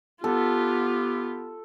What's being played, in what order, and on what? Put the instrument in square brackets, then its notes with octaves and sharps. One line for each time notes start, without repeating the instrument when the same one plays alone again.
[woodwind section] B3 G4 [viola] F4 [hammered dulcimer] A4